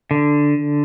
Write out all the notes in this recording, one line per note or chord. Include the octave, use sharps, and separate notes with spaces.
D3